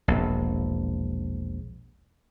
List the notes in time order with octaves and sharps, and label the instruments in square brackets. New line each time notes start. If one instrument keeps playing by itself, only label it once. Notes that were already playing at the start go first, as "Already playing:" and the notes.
[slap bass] E1 A#1